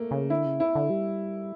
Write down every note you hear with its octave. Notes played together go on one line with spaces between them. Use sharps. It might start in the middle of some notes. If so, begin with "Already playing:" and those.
Already playing: A3 A#3
C#3
D3 E4
C#3
E4
D3
G3